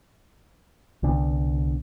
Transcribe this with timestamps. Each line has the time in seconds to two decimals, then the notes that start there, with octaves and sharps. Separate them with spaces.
1.03 C2 B2 D3